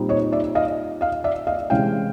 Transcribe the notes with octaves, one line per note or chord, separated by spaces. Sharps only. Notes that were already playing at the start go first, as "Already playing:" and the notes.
Already playing: A#2 G3 C4 D#4
C#5 D#5
D5 E5
D#5 F5
D#5 F5
D5 E5
D#5 F5
C3 E3 G#3 C#4 F5 G5